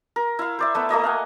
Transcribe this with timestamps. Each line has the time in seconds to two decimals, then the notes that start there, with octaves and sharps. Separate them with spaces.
0.16 A#4
0.39 E4 F5
0.59 C5 D5 E5
0.75 A3 B3 E5
0.89 A3 A#3 D#5 E5
1.04 F5 F#5 G#5